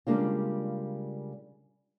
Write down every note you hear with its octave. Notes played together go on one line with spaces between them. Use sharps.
C#3 G3 G#3 A#3 D4 F4